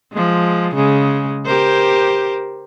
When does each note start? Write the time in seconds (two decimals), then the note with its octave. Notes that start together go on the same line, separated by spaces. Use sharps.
0.12 F3 G#3
0.75 C#3 G#3
1.46 G4 A#4 C5